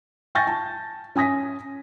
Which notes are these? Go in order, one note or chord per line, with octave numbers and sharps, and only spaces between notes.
G5 G#5 C#6 G6 A6 A#6
A5
C#4 G#5 D#6 A#6 B6